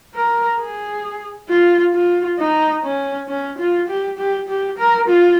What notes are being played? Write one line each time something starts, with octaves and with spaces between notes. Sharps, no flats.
A#4
G#4
F4
F4
D#4
C#4
C#4
F4
G4
G4
G4
A#4
F4